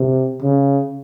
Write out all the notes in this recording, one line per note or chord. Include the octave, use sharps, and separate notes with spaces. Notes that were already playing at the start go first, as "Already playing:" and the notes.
Already playing: C3
C#3